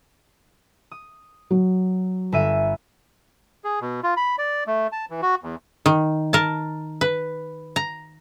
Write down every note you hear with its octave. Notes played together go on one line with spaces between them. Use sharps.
D#6
F#3
G1 E5 D#7
G#4
B2
F4
B5
D5
A3
A5
E3
F#4
E2
D#3
A#4 A5
B4
A#5